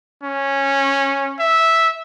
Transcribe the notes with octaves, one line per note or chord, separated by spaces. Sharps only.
C#4
E5